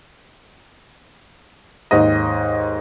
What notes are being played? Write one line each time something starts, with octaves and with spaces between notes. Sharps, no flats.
D#2 G#2 D#5